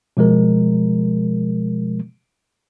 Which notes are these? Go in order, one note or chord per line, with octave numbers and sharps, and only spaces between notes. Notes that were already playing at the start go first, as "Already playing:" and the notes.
B2 F3 G#3 A#4